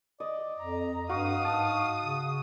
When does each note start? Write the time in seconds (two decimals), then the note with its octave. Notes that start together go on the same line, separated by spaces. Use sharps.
0.20 D5 D#5
0.59 F2 A#5
1.09 G2 F#4 F5 D#6
1.45 G#2 A5
2.01 C#3